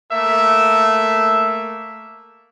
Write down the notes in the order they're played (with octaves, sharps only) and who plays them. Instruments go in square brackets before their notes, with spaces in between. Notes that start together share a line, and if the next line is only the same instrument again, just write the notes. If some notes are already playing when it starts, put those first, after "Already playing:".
[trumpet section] A3 A#3 E5